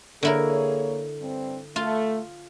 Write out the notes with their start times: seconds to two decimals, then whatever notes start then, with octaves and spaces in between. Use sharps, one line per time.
0.23 D3 A#3 E4 G#4 A#4 C#5
1.20 G2 C4
1.76 A3 F4